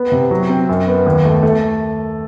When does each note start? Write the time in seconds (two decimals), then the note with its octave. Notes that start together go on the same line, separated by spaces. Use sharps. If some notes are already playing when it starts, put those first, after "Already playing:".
Already playing: B3
0.12 C3
0.31 F#3
0.49 C4
0.69 F#2
0.87 B3
1.06 D#2
1.25 A3
1.43 A3